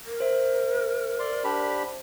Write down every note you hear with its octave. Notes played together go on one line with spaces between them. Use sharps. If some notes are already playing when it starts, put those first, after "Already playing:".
A#4
C5 E5
D5 C6
D4 G4 B5